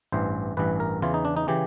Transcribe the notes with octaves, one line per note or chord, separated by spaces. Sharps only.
A1 G2 E3 C5
A1 G2 E3 B4
A#4
E2 C#3 E3 F4
D#4
D4
D#4
C#3 E3 G4